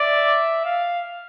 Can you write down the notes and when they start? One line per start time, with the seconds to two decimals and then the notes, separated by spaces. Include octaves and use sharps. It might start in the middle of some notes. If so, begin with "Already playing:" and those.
Already playing: D5 E5
0.65 F5